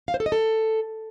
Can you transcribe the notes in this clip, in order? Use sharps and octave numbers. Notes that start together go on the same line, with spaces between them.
F5
C5
A4
D#5
A4